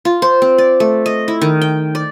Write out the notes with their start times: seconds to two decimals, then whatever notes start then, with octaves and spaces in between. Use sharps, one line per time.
0.05 F4
0.22 C5
0.42 C4
0.58 D5
0.80 A3
1.06 D#5
1.28 E4
1.41 D#3
1.62 G5
1.95 D5